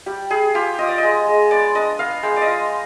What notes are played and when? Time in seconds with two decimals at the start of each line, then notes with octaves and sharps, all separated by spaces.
0.06 G3 G4
0.30 G3 G#4
0.55 F4 G4
0.79 F4 D#5
0.88 D5
0.98 G#3 D#5
1.27 G#3
1.51 B3 D5
1.75 D4 D#5
1.99 B3 F5
2.23 G#3 G5
2.36 D5
2.42 D#5
2.47 F4